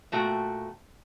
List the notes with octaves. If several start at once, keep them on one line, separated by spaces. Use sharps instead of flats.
A#2 A3 F#4 E5 G5